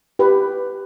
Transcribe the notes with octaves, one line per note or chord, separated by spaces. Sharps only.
G4 B4